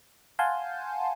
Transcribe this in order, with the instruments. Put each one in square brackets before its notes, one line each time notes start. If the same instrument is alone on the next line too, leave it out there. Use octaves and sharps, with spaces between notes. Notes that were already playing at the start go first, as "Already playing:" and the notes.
[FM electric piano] F5 F#5 G#5 A5 C6 G6